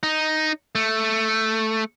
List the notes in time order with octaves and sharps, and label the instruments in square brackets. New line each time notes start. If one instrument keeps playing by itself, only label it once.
[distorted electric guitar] D#4
A3